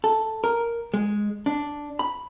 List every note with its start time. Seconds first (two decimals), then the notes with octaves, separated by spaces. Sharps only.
0.04 A4
0.44 A#4
0.94 G#3
1.46 D4
1.99 B5